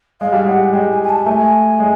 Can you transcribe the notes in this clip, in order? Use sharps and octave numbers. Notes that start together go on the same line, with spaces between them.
G#3 F5
G3
G#3 F#5
G#3 G5
G#5
G#5
A5
A3 G#5
G#3